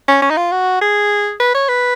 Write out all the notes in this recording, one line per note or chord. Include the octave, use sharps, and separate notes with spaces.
C#4
C#4
D#4
F4
F#4
G#4
B4
C#5
B4